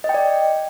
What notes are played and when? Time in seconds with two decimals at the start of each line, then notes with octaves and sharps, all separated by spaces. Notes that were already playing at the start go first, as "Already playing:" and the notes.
0.04 D#5
0.09 G5
0.14 D5